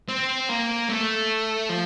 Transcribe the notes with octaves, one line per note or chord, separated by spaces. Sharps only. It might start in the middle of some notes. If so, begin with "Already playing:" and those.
C4
A#3
A3
F3